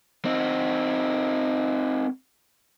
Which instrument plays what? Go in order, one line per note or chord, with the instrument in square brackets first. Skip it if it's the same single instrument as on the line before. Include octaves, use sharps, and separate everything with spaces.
[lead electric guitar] C4 D#4